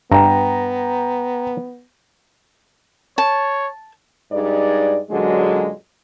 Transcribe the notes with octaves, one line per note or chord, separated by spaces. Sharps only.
G2 B3 G5 A#5
C#5 A5
G2 G#3 D#4 D5
F#2 A#2 D3 F#3 G#3